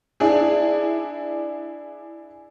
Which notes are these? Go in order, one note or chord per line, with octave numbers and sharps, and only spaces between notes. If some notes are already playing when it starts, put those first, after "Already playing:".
D4 E4 G#4